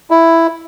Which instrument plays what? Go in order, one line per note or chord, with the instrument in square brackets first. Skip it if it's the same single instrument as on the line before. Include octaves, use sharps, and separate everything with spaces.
[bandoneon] E4